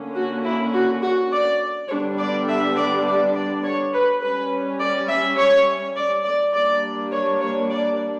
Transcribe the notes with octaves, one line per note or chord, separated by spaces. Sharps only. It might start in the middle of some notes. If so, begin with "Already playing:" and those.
Already playing: D3 A#3 C#4
F#4
E4
F#4
F#4
D5
D3 G3 B3 D4 C#5
D5
E5
D5
D5
D5
C#5
B4
G3 C#4 B4
D5
E5
C#5
D5
D5
G3 A#3 D4 D5
C#5
C#5
D5